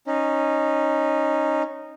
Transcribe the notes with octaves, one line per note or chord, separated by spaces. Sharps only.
C#4 D#4